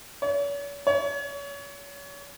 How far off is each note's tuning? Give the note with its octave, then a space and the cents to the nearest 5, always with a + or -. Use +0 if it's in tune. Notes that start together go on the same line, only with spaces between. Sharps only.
C#5 +40
C#5 +30